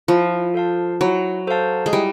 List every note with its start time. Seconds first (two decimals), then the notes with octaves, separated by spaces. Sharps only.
0.08 F3 E4
0.54 A4 C5 F5 A5
1.01 F#3 E4
1.47 A4 C5 F5 A5
1.86 G#3
1.93 G3 E4